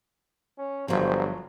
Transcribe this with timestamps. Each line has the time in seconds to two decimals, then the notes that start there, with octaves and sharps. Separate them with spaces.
0.58 C#4
0.88 G1 F3 F#3 C5